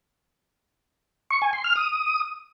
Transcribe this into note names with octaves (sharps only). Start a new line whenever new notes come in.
C#6
G#5
C6
F6
D#6